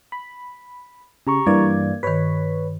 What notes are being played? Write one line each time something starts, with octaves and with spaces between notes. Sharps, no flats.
B5
C#3 G4 A#5 C#6
G2 E3 A#3 A#4 D5 G#6
G2 D#3 B4 C#5 B6